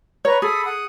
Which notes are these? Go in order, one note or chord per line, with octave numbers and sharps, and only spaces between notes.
B4 C#5 A#5 C#6
G#4 A4 B5 D#6
F#5 D#6